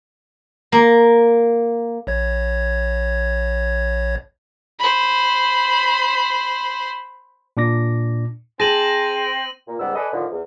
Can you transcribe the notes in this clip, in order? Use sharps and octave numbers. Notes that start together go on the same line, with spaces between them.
A#3
A#1 C#5 G#6
C5 B5
A#2 D4 D6 A#6
C4 G#4 A5 A#6 D#7 F#7
A#2
C#2 G#2 G3 B3 F#5 E6
A4 B4 D5 D#5 G#5 B5
A2 D3 D#3 F3
E2